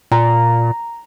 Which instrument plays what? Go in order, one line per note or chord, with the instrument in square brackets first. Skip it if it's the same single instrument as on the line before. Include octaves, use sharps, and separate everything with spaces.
[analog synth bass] A#2 [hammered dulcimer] A#5